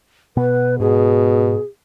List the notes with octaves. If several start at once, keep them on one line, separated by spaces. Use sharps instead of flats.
B2 B3 B4
G#2 B2 G#4